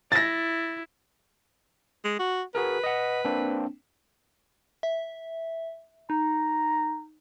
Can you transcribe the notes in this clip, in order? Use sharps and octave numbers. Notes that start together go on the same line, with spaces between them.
E4 A6 A#6
G#3
F#4
F#4 G#4 A#4 B4
D#5 F#5
A#3 C4 D4
E5
D#4 A#5